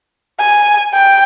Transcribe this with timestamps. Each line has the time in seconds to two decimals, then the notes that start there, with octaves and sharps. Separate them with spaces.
0.40 G#5
0.94 G5